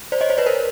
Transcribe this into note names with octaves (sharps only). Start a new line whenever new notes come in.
C5 D5
C#5 D#5
C5 D5
B4 C#5
A#4 C5